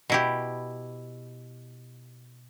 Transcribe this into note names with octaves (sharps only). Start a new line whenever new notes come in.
B2 E4 G4